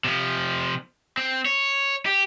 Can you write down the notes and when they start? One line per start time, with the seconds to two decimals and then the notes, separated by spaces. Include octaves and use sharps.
0.05 C3 F3
1.17 C4
1.46 C#5
2.06 G4